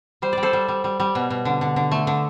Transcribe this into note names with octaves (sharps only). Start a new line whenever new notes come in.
G3 C5
G3 D5
A4 C5
G3
G3
G3
G3
B2
B2
D3
D3
D3
A3
D3